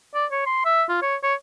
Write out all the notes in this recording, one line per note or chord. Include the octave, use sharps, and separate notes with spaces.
D5
C#5
C6
E5
F4
C#5
C#5